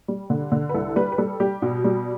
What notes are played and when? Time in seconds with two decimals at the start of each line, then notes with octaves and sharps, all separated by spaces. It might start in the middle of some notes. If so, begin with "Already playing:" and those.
0.08 G3
0.30 D3
0.52 D3
0.69 B4
0.74 C2 A4
0.96 G3 B4
1.12 B4
1.18 G3 A4
1.40 G3 G4
1.62 B2
1.84 G3